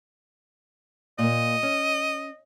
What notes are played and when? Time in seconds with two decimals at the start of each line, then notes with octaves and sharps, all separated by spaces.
1.19 A#2 A#3 D#5
1.63 C#4